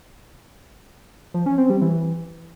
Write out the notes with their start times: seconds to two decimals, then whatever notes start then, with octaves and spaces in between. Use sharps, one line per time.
1.34 F3
1.46 C#4
1.58 C4
1.70 G3
1.81 E3